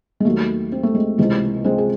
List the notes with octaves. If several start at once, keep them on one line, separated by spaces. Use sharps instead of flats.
G#3
D#2 D#3 F#3 A3
C4
A3
G#3 C4
C#2 C3 E3 G#3
G#3 C4
G#4